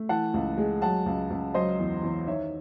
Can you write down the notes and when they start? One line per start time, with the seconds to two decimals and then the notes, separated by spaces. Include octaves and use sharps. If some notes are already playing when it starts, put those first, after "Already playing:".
Already playing: A3
0.09 E3 F#5 A5
0.34 C#2
0.58 G#3
0.82 F#3 F#5 A5
1.06 C#2
1.30 C#2
1.54 F#3 C5 D#5
1.79 E2
2.03 E2
2.27 D#3 C#5 E5